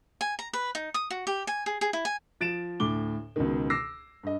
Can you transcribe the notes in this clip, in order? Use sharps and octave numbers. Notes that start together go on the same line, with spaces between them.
G#5
A#5
B4
D#4
D#6
F#4
G4
G#5
G#4
G#4
E4
G#5
F3 A6 D7 E7
D2 A2 D6 G7
C#2 B2 D#3
D6 E6 A#6 C7
G2 D#5